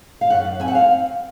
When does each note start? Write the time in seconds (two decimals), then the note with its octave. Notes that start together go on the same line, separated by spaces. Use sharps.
0.21 F5
0.30 F#2 F#5
0.60 C4 G#5
0.68 F#5
0.75 F5